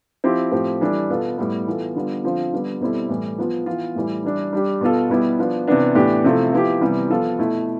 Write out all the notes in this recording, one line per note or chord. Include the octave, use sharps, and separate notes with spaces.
F3 C4 E4 G4
A2 F3 C4 G4
E3 G3 D4 A4
B2 B3 F4 A4
A2 G3 B3
E3 B3 F4 A4
D3 G3 B3 F4
D3 F3 C4 F4
D3 G3 B3
B2 G3 C4 E4 A4
A2 E3 G3
F3 B3 F4
E3 B3 F4
A2 E3 G3
E3 G3 D4
G3 D4 G4
B2 B3 F4 A4
B2 G3 B3 E4 G4
F3 B3 D4
C3 E3 B3 D4
A2 E3 B3 D4 G4
C3 F3 A3 E4 A4
F3 B3 E4 G4
C3 E3 G3 B3
F3 B3 F4 A4
B2 A3 E4